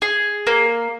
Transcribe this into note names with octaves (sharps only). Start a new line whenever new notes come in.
G#4
A#3